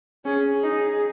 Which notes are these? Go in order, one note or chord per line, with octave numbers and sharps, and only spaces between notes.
C#4 G#4
D#4